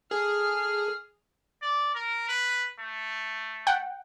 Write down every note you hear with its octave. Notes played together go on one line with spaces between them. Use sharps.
G#4 A4 F6
D5
A#4
B4
A3
F#5 G5